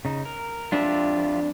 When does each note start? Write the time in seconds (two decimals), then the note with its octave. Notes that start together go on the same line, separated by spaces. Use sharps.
0.05 C#3 D#4
0.25 A#4
0.72 F2 D4 F4 G4 E5